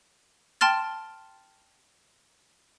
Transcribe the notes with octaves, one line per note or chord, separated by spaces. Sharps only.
G5 A5 C6 F6 A6